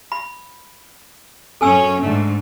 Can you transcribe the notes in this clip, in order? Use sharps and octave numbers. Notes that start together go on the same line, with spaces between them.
B5
F#2 C#4 A4 G#5 E6
G#2 D3 A3